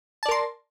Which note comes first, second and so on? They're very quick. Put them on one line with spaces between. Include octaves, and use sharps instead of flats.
A5 D5 A#4 C6